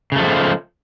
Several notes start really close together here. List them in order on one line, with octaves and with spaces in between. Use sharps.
C#3 A3 F3 G#3